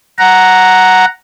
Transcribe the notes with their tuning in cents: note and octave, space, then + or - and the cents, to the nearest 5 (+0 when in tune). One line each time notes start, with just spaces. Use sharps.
F#5 +0 A#5 +0